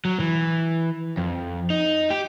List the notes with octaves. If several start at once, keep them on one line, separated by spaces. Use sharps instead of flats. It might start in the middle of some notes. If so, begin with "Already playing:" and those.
F#3
E3
F2
D#4
G4